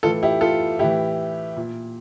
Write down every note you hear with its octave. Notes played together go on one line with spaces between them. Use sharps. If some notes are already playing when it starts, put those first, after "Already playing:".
A2 E3 F4 A4
E4 G4
F4 A4
A2 E3 E4 G4
A#2